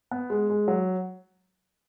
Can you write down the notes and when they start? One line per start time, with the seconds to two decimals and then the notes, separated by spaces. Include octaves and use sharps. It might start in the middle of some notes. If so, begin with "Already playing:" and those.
0.11 B3
0.30 G#3
0.50 G#3
0.68 F#3